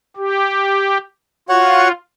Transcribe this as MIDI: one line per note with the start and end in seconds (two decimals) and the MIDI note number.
0.17 0.98 67
1.49 1.92 65
1.49 1.88 66
1.49 1.88 73
1.49 1.88 78